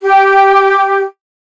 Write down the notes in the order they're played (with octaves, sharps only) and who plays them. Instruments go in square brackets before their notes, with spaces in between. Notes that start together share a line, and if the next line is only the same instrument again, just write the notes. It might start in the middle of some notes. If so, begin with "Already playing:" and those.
[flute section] G4